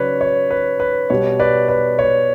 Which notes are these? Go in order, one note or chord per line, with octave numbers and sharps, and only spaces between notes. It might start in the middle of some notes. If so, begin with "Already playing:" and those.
Already playing: C#3 F#3 B4 C#5 D5
C#5
B4
B4
B2 G3 C#5
B4 D5
B4 D5
C#5